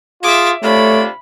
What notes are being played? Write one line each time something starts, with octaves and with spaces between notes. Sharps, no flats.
F4 G#4 E5 D6
C3 A3 D4 F4 C#5 B5